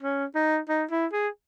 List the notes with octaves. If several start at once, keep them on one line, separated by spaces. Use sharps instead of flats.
C#4
D#4
D#4
E4
G#4